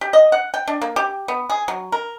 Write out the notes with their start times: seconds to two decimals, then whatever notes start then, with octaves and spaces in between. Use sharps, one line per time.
0.01 G4
0.13 D#5
0.32 F#5
0.54 G5
0.67 D4
0.82 A#3
0.96 G4
1.28 B3
1.50 G#4
1.68 F#3
1.92 A#4